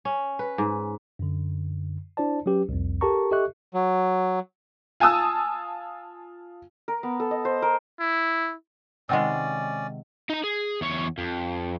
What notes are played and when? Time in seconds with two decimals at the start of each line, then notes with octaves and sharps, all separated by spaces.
0.05 C#4
0.39 B4
0.58 G#2
1.19 F#2 D3
2.17 D4 E4 C5 D5 A5
2.46 F#3 C#4 G4 B4
2.69 C2 F2
3.01 G4 A4 A#4 A5 A#5 C#6
3.31 G4 A4 D#5 E5 C#6 F#6
3.74 F#3
5.00 F4 G#5 A5 D#6 E6
6.88 A#4
7.03 B3
7.20 A4
7.31 D#5
7.45 C5
7.62 A#4
8.00 E4
9.09 C3 D#3 G#3 C#4 D5 D#5 F#5 E6
10.30 D#4 A#5
10.44 G#4
10.81 E2 C#5
11.18 F2